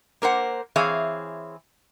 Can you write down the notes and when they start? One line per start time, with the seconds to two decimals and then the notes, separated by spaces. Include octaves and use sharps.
0.22 A#3 A#4 C5 F#5
0.76 E3 C4 G#4 C#5 E5 F5